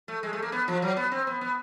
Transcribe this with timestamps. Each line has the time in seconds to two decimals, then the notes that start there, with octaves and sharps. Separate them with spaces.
0.08 A3
0.23 G#3
0.33 A3
0.42 A#3
0.52 B3
0.68 F3
0.82 F#3
0.97 B3
1.12 C4
1.27 B3
1.41 B3